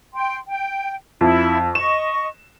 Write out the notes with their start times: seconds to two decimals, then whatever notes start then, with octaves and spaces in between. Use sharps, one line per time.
0.14 G5 C6
0.49 G5
1.21 F2 E4
1.75 D#5 C#6 E7